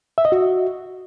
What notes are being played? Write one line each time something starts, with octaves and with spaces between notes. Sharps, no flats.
E5
D#5
F#4